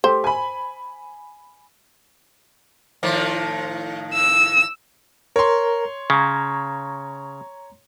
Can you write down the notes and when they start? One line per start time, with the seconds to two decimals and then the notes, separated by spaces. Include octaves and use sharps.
0.04 A3 G4 C5
0.24 G#5 B5
3.03 A2 D#3 F3
4.13 E6
5.36 A#4 C#5 A#5 C6
6.10 C#3 A#5 G#6